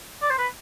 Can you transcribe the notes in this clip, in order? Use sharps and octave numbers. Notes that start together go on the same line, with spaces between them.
D5
C5
B4